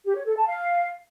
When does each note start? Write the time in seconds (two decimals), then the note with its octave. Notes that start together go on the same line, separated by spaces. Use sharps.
0.06 G4
0.16 C#5
0.26 A4
0.36 A5
0.47 F5